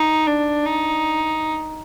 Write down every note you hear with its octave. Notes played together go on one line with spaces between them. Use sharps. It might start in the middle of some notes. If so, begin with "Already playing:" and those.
Already playing: D#4
D4
D#4